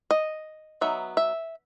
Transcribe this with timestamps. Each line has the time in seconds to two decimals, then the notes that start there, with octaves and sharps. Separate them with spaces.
0.11 D#5
0.81 F#3 B3 D#4 E5
1.17 E5